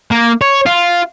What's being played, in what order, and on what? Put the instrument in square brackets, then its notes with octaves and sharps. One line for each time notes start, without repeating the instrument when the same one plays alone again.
[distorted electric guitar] A#3
C#5
F4